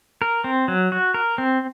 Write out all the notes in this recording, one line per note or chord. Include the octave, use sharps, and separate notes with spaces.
A#4
C4
F#3
F#4
A#4
C4